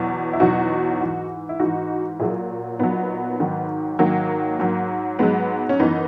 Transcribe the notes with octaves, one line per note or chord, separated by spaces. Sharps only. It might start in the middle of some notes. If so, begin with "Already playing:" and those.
Already playing: E2 B2 F#3
E4
E2 B2 F#3 D#4 F#4
G#2 E3
E4
G#2 E3 D#4 F#4
A#2 F#3 E4 G#4
A#2 F#3 B3 D#4
G#2 D#3 F#3
G#2 D#3 F#3 A#3
G#2 F#3
G#2 F#3 G#3 B3
C#4
F#2 E3 B3 D#4